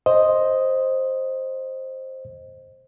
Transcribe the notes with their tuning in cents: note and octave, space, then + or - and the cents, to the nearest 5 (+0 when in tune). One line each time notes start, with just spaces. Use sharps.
C5 +10 D#5 +0